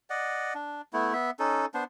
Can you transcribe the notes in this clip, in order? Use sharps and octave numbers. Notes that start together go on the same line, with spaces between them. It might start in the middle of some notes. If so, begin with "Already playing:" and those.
D5 D#5 F#5
D4
A3 B3 E4
B3 E5
C#4 D#4 A4
B3 D4 C5